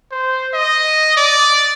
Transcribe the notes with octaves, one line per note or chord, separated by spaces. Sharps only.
C5
D#5
D5